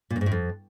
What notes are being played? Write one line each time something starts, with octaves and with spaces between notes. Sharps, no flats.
A#2
F#2
G#2
A2
F2